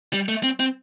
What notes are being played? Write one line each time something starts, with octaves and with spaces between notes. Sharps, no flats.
G3
A3
C4
C4